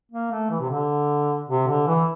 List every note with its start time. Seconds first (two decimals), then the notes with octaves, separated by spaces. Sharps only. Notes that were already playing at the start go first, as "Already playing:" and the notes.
0.12 A#3
0.31 A3
0.51 E3
0.60 C3
0.70 D3
1.49 C3
1.68 D3
1.87 E3